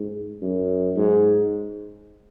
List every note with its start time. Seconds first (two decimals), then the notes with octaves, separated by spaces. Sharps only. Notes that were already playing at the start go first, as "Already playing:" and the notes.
Already playing: G#2
0.42 F#2
0.97 G#2